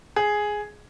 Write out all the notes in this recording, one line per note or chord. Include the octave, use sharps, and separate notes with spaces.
G#4